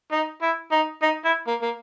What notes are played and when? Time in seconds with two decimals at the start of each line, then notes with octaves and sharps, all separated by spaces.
0.12 D#4
0.42 E4
0.72 D#4
1.02 D#4
1.25 E4
1.47 A#3
1.62 A#3